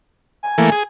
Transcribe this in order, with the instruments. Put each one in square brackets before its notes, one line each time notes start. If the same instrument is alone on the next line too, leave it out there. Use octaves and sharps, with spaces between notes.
[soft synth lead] G#5
[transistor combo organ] E3 A3 A#3
G#4